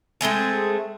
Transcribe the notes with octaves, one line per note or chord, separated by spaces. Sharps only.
G#3 A3 C4 G#4